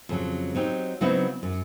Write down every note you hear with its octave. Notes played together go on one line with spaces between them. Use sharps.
F2 C#3 F#3
F#3 C4 D#4 G4
C#3 F#3 B3 C4 D#4 E4
F#2